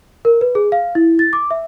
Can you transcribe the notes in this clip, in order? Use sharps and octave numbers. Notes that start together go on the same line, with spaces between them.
A#4
B4
G#4
F5
E4
A6
D6
E5